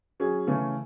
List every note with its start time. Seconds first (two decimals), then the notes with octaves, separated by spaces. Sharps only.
0.20 F#3 C#4 G#4
0.47 C#3 E3 A3 C#4